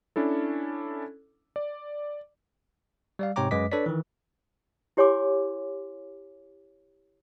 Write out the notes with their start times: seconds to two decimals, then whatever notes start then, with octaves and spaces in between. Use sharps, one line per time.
0.16 C#4 D4 E4 A4
1.56 D5
3.19 G3 D5 F5
3.36 G#2 C3 C#5 G5 A#5 D6
3.51 F#2 G#3 B4 D#5 D6 B6
3.71 D4 A4 B4 C#5 D5 B6
3.86 D#3 E3
4.97 E4 G4 C#5 G#5 C6 D6